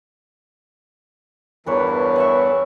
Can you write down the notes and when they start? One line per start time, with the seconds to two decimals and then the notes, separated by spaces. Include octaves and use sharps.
1.66 E2 G2 E3 A#4 B4 C#5
2.16 B4 E5 C#6